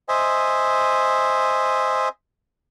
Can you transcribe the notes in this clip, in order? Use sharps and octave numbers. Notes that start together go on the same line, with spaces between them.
C5 D#5 E5 G#5